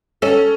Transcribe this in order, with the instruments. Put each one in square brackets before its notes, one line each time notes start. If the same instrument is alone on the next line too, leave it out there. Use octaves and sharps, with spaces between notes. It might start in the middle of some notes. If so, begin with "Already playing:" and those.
[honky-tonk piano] C#4 [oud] A4